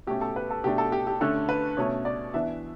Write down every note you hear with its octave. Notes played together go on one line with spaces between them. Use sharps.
B2 A3 C#4 G4
A4
B4
A4
B2 A3 D4 G4
A4
G4
G4
D3 A3 C#4 A4
B4
B2 A3 C#4 C#5
D5
E3 B3 D4 E5